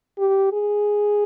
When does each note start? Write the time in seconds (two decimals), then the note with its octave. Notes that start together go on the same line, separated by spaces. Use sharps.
0.18 G4
0.52 G#4